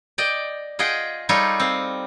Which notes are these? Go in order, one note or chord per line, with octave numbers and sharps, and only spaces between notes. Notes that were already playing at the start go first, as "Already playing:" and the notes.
D5 D#5 G5
F4 G#4 D#5 F#5 G5
G3 D#4 F4 A4 C#5
C4 F5